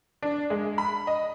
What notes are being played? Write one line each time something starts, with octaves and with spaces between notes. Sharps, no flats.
D4
G#3
B5
D#5